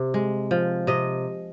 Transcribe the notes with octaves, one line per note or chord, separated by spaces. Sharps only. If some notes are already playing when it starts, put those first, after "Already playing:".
Already playing: C3
G#3
F3
C3 D#5